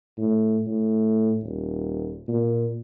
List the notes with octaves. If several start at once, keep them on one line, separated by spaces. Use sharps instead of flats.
A2
A2
D#1
A#2